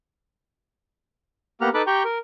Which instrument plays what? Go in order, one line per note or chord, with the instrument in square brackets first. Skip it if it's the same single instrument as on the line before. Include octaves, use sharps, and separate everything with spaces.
[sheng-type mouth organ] A#3 B3 G4 F#5 A#5 F6
D#4 A4 B4 B5 D6 F#6
G4 G5 A#5 C#6 G6
A#4